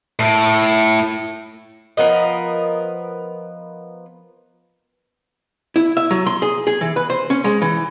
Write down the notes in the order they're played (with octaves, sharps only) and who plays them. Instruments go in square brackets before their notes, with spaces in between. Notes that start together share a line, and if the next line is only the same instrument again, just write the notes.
[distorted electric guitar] A2
[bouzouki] F3 B3 A#4 D#5
[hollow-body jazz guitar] E4
E5
F#3
C6
G#4
G#4
E3
B4
C5
C#4
G#3
E3